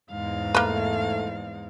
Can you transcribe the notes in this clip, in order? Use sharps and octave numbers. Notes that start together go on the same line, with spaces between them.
E2 G#2 F5
A3 A#3 B4